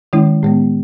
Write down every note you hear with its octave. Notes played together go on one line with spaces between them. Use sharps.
D#3 G#3 C#4 E4
A2 G#3 B3